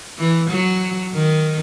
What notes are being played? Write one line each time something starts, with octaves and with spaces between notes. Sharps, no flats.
E3
F#3
D#3